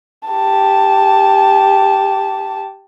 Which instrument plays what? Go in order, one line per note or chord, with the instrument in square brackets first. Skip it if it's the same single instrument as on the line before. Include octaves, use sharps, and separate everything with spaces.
[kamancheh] G4 A5